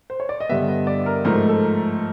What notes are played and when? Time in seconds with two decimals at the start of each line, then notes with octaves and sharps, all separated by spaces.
0.10 C5
0.20 C#5
0.29 D5
0.40 D#5
0.49 G2 D3 G3 B3 E5
0.69 D#5
0.87 D5
1.06 A#4
1.25 G#2 F3 A3 A#4
1.49 A4